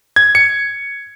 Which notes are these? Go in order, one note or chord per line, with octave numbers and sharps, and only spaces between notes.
G#6
C#7